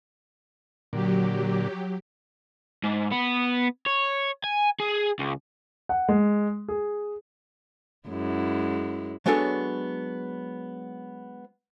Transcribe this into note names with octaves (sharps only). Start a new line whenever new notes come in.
A#2 D3 F#3 G4
G#2
B3
C#5
G#5
G#4
C#2
F#5
G#3
G#4
F#2 G#3 E4
F#3 G#3 B3 D4 A4 C#5